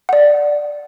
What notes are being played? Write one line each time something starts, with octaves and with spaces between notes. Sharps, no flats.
D5 F#5